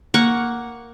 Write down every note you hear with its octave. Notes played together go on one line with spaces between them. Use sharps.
A#3 F#5 C#6